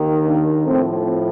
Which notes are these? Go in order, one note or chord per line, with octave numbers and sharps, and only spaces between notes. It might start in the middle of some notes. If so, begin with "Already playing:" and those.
Already playing: D#2 D#3
A#3 D4
A2 F3 A3 C4